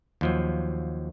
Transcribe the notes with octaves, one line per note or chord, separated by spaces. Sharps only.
D#2 F3 F#3